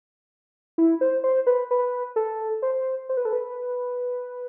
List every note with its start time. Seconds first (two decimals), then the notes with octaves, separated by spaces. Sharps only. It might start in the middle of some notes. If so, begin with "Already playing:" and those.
0.78 E4
1.01 C5
1.24 C5
1.47 B4
1.71 B4
2.16 A4
2.62 C5
3.09 C5
3.17 B4
3.25 A4
3.33 B4